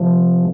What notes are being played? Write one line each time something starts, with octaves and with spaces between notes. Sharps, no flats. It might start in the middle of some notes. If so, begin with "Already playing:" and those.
Already playing: C3 F3